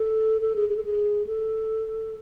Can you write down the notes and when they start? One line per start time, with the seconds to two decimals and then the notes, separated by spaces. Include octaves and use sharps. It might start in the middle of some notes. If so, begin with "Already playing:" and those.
Already playing: A4
0.41 A4
0.56 G#4
0.70 G#4
0.77 A4
0.85 G#4
1.27 A4